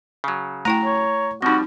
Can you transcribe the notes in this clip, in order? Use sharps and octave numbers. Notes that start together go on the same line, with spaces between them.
C#3 F#3
A3 E4 G5 A#5
C#5
F3 G3 C4 D#4 F#4